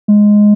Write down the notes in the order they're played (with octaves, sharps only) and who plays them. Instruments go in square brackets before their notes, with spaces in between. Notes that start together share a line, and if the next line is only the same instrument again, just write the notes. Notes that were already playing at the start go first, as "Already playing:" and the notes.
[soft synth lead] G#3